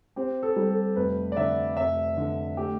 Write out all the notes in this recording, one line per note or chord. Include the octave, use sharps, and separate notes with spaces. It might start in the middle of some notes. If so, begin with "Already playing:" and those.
C4 G4
A4
G3
A4
F1 B4
D5
D3 E5
F1 E5
D3
A3 G4